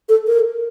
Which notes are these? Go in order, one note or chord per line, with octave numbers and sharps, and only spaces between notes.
A4
A#4